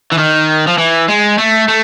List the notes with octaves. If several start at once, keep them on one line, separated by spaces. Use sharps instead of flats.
E3
D#3
F3
E3
G#3
A3
A3